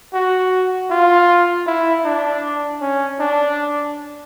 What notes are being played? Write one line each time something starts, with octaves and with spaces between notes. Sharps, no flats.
F#4
F4
E4
D4
C#4
D4